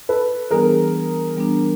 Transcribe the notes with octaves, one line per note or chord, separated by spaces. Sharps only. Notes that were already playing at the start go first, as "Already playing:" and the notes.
A4 B4
E3 G3 B3 D4 G#4 A#4
E3 G3 B3 D4